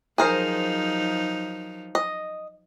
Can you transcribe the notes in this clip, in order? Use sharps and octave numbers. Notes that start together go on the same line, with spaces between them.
F3 F#3 D#4 G#4 A#4 C5
D#5